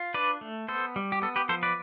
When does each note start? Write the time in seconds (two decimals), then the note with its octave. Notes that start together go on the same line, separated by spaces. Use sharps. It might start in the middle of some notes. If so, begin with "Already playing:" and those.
Already playing: F4
0.14 D4 B4 D5
0.41 A3
0.68 B3 A4 C5
0.96 G3
1.12 G4
1.22 B3 A4
1.36 G4 B4
1.49 F3 A4 C5
1.63 B4 D5